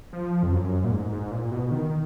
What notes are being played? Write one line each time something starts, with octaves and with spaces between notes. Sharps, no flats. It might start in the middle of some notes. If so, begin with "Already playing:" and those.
F3
F2
F#2
A#2
G#2
G#2
A#2
B2
D#3